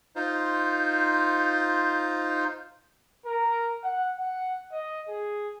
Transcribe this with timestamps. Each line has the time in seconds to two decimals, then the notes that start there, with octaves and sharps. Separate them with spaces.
0.16 D#4 F4 C5
3.26 A#4
3.84 F#5
4.18 F#5
4.72 D#5
5.09 G#4